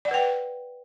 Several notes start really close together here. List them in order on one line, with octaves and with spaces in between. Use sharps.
D5 F#5 B4 G5